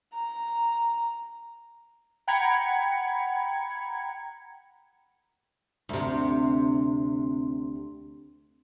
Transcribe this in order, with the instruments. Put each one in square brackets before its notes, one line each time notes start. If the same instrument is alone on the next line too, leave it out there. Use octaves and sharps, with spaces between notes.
[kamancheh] A#5
[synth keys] F#5 G5 A#5 B5 G#6 C#7
[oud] D2 C3